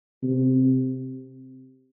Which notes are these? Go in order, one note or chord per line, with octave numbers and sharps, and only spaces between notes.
C3